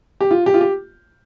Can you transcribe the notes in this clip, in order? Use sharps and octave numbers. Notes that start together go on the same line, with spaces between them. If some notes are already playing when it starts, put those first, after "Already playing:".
G4
F4
G4
F4
G4